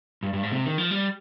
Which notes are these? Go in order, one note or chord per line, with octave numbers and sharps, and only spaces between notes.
G2
G2
G#2
C3
D#3
F3
G3